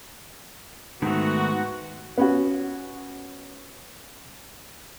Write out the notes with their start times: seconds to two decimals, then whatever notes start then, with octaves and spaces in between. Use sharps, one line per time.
1.02 G#2 D#3 A3 B3 F#4
2.18 B3 C#4 F#4